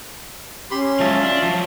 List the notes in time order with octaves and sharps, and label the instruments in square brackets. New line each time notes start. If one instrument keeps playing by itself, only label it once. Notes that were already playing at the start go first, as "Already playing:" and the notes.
[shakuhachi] C#4 [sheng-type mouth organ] G4 B5 C6
[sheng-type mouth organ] C6
[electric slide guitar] F3 F#3 G#3 [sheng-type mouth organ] F4 E5 A5
[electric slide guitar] D4
F3 F#3